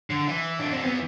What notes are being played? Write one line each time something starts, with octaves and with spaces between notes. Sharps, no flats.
D3
E3
D4
C4
B3